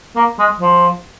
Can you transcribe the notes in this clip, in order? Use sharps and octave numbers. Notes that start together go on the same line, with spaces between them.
A#3
G#3
F3